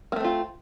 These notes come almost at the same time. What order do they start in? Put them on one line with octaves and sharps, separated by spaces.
A#3 A3 C4 F4